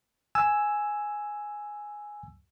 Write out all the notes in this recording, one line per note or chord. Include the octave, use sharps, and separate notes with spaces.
G#5 E6